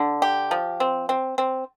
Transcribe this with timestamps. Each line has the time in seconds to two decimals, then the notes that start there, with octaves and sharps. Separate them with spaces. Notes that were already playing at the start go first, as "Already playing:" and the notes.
Already playing: D3
0.22 G4
0.51 F3
0.80 C4
1.09 C4
1.38 C4